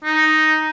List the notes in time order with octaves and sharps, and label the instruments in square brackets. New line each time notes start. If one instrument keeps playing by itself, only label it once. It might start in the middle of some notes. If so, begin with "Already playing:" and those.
[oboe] D#4